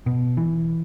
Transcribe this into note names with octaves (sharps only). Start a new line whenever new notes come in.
B2
E3